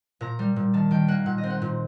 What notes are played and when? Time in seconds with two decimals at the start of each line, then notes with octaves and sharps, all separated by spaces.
0.21 A#2 A#5
0.39 G3
0.56 A#2
0.74 D#3 A5
0.91 D#3 G5
1.08 A#3 F#5
1.26 A#2 F#5
1.38 D#5
1.43 C4
1.50 F#5
1.62 A#2